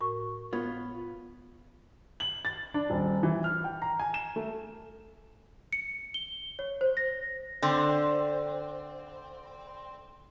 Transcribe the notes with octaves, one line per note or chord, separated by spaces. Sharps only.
A2 F#4 A#4 C#6
B3 F4 C#5 G#6
F#7
A6
D4
D#1
E3
F6
G5
A#5
G#5
E7
A3
C#7
G7
C#5
C5
A#6
D3 C4